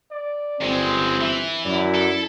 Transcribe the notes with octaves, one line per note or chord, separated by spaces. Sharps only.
D5
G1 F#2 G#3 C4
E3 E5
F#2 E4 D5
A4